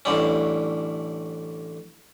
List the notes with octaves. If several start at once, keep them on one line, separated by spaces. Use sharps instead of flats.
A1 A2 D3 G3 C#4